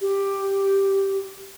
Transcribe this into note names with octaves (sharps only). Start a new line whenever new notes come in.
G4